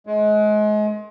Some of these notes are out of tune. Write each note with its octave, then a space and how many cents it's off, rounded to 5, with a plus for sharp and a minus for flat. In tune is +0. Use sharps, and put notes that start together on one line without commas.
G#3 +30